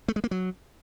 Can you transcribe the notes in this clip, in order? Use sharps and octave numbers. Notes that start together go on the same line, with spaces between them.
A3
G#3
A#3
F#3